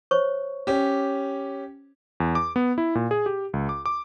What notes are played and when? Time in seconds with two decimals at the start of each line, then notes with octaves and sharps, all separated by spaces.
0.11 C5 C#5 C#6
0.67 C#4 G4
2.20 E2
2.35 D6
2.56 B3
2.78 E4
2.95 A#2
3.11 G#4
3.26 G4
3.53 C#2
3.69 D6
3.86 D6